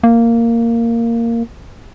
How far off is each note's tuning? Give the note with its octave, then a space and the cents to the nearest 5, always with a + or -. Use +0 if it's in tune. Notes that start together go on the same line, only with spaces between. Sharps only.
A#3 -10